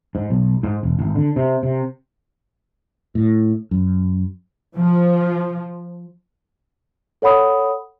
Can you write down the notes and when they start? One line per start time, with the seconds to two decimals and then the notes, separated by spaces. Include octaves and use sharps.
0.15 G#2
0.30 B1
0.63 G#2
0.83 E1
0.99 G#1
1.15 D3
1.36 C3
1.63 C3
3.15 A2
3.71 F#2
4.77 F3
7.22 A4 C#5 F#5 B5 D#6